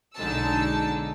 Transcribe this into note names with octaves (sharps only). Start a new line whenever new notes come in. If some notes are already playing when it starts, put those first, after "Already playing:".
B1 D3 G#3 D#4 A5 E6